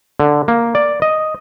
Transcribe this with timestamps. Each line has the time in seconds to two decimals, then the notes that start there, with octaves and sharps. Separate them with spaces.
0.20 D3
0.48 A#3
0.75 D5
1.02 D#5